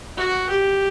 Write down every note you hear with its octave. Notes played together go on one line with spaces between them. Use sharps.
F#4
G4